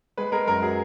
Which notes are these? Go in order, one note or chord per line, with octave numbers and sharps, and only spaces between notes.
G#3 B4
G#3 A#4
F#2 A#4
F#3 G#4